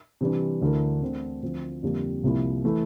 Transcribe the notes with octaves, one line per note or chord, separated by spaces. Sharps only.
C3 E3 G3 D4
D2 D3 A3 E4 A#4
D3 A3 C4
D2 D3 F3 C4
F2 D3 G3 A#3
C2 C3 F3 A#3 E4
E3 A3 E4